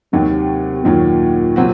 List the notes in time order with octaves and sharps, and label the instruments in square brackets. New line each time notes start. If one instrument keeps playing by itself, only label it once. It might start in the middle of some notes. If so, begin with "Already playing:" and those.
[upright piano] D#2 D#3 F#3 [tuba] C3
[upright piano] D#2 D#3 F#3 [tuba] A#2
[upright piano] C3 F#3 C4 F#4